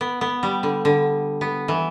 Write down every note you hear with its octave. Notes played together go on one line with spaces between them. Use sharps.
B3
B3
G3
D3
D3
B3
E3